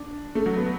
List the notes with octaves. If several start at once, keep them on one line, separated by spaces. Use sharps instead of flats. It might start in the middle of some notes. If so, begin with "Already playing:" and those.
Already playing: D4
A3
F#3
B3